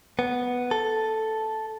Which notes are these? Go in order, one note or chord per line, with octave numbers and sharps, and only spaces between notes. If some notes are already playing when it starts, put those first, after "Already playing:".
B3
A4